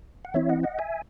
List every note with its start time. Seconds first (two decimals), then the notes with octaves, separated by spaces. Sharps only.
0.25 F#5
0.34 E3 C4 E4 C#5 E5
0.49 D#5 F#5
0.63 D#5 F#5
0.79 E5 G#5